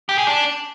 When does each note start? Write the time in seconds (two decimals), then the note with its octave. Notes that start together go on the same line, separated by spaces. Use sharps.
0.09 G4
0.18 G#4
0.27 D4